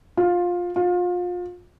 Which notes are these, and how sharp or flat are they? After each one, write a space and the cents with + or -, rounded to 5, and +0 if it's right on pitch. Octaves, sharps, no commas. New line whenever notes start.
F4 +15
F4 +30